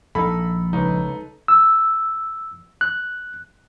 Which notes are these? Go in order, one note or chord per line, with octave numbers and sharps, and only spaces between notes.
A#1 A#3 D#4 A4 B5
C#2 D#4 B4
E6
F#6